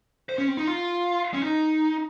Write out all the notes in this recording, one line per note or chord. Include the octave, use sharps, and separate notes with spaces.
C5
C#4
C4
D#4
F4
C#4
D#4